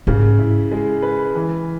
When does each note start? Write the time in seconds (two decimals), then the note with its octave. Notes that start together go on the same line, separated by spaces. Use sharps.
0.07 G#2 C#3
0.39 E4
0.72 G#3
1.02 B4
1.35 E3